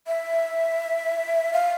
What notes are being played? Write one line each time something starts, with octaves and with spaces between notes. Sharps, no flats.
E5
F5